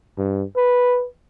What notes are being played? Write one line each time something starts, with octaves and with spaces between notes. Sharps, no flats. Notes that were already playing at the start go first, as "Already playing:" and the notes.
G2
B4